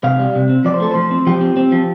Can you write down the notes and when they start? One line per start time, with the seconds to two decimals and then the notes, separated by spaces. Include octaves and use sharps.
0.04 C3 F5
0.19 G3
0.35 C3
0.49 C4
0.65 F3 D5
0.74 C5
0.80 A3 A4
0.91 F3 C5
1.11 C4
1.27 F3 G4
1.41 C4
1.57 C4
1.72 F3